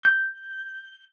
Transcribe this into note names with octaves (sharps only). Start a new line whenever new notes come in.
G6